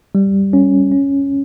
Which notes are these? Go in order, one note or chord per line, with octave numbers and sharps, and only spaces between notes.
G3
C#4
C#4